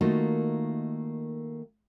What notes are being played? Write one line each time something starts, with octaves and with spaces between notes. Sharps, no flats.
D#3 A3 A#3 D#4 F4 F#4